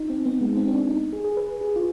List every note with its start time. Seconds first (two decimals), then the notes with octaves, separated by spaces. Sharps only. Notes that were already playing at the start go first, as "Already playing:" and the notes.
Already playing: D#4
0.10 C4
0.26 B3
0.41 G#3
0.57 C4
0.68 C4
0.73 D4
0.89 D#4
1.13 G#4
1.24 G#4
1.37 B4
1.61 G#4
1.76 F4